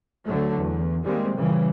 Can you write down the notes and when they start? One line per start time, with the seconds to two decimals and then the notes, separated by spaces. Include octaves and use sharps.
0.25 D2 D3 F#3 A3
0.58 E2
1.04 D#3 G3 G#3 A#3 C4
1.36 A#2 C#3 E3 G3